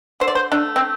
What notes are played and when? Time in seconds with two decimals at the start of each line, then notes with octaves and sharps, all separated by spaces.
0.20 D3 C5
0.28 D5
0.35 C5
0.52 A3 D4
0.76 C4